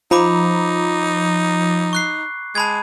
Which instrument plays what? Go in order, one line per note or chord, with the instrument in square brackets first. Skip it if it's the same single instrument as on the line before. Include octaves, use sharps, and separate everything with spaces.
[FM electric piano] F3 [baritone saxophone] D#4 [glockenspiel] A#5 B5 D6
[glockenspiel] C#6 F#6 C7
[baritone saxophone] G#3 [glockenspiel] A5 B5 G#6